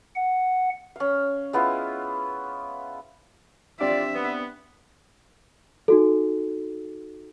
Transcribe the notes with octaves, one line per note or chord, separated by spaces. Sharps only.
F#5
C#4 F5
G#3 B3 E4 F4
C4 D4 F4 G4 D5 E5
B3
D#4 F#4 A4